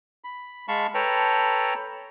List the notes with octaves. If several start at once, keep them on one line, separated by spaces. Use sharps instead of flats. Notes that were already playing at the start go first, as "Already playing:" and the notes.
B5
G#3 F5 A5 B5 C#6
A4 B4 C#5 G5 A5 A#5